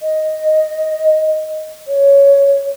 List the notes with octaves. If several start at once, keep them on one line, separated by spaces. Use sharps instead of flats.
D#5
C#5